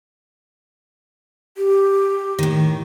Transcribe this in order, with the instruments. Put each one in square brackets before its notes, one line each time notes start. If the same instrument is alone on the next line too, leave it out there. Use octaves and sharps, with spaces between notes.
[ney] G4
[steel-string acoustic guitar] A2 D#3